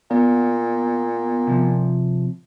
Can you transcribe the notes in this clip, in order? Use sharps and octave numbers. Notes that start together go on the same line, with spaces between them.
A#2 B3
C3 F3